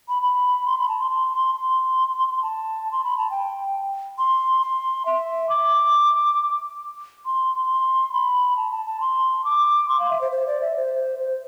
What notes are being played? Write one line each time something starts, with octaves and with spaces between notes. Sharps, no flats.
B5
B5
C6
B5
A5
C6
C6
C6
C6
A5
C6
B5
A5
G5
C6
C6
E5
D6
C6
C6
B5
A5
A5
A5
C6
D6
C6
F5
E5
C5
C5
D5
E5
C5
C5